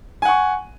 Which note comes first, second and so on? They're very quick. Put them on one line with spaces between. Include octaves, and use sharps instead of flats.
G#5 F#5 C#6